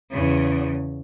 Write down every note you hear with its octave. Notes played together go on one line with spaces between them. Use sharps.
E2 C#3